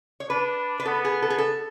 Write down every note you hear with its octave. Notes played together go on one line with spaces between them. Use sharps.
C#5
D4 B4
B4
B3 A4
G#4
A4
G#4
A4